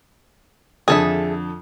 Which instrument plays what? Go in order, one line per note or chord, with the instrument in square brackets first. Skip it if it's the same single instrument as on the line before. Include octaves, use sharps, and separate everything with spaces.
[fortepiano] F2 D3 [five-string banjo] G#4 A4 E5